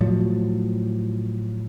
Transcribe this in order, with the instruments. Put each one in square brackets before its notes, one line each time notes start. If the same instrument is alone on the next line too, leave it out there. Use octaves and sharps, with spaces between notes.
[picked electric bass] A2 F3 F#3